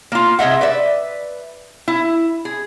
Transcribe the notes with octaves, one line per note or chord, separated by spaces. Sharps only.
A#3 F4
C3 G#4 D#5 E5 F#5
B4 D5 E5
E4
G#4